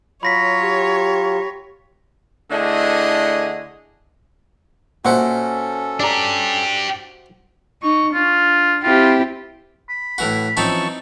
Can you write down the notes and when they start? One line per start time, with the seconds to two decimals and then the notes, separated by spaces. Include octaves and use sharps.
0.23 F#3 F4 C#5 B5 A#6 B6
0.63 G4
2.51 D3 A3 D4 E4 G#4 D#5
5.05 A#2 C#4 F#4 A4 C5 E5 F#5
6.00 D4 G4 D5 A#5
7.83 D#4 C#6
8.14 D4 F4
8.83 C4 E4 F4 G4
9.89 B5
10.18 A2 E3 F#4
10.57 E3 F3 C4 C#4 D#4 E4 A5 C#6